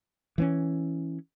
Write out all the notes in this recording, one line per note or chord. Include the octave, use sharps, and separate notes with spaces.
E3 C4 C#4